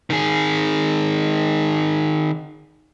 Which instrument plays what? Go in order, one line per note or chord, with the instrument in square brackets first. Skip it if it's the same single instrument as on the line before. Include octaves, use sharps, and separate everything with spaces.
[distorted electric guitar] D#3 G#4